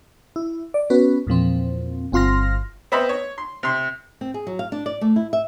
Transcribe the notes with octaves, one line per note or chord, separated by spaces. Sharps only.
E4
D5
B3 C#4 F#4 B4
E2 A#2 F3 C4
G1 C4 F4 C6 F6 A#6
B3 C4 C5 D#5 E5 B5
C#5
C6
C3 C6
C4
G#4
F#3
F5
D4
D5
A3
E4
E5